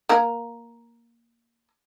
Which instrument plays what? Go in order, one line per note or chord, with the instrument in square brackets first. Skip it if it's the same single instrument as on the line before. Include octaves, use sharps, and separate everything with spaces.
[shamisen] A#3 A#4